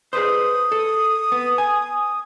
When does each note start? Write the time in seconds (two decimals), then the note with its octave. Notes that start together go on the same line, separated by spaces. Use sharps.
0.13 G#4 B4 C5 D#6
0.72 A4
1.32 B3
1.58 G#5